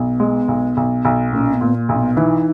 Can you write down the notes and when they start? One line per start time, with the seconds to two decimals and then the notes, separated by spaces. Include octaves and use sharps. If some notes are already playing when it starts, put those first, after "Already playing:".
Already playing: B1 B3
0.20 G#3
0.48 B1
0.77 B1
1.05 B1
1.33 A#2 C#4
1.54 B3
1.61 A#2
1.75 A#3
1.89 B1
1.96 C#4
1.99 B3
2.17 E3 D#4